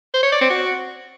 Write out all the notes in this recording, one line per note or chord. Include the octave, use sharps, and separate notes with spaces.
C5
C#5
D5
C4
F#4